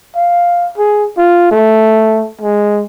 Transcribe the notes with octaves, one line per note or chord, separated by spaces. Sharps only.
F5
G#4
F4
A3
G#3